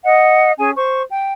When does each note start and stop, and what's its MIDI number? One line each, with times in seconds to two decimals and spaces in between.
0.04 0.52 75
0.04 0.52 78
0.58 0.70 61
0.58 0.70 68
0.58 0.70 80
0.76 1.01 72
0.76 1.01 85
1.10 1.33 79